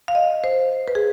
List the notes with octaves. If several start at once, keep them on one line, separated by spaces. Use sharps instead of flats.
F5
D#5
C5
B4
G#4